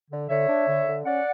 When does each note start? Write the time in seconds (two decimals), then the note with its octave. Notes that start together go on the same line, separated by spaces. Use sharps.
0.11 D3
0.29 D3 C#5 E5
0.49 D4
0.67 D3
0.86 D3
1.05 C#4 D5 F#5